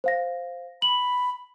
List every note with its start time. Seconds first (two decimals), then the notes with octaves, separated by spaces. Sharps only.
0.04 C5 F5 A#6
0.82 B5 F#7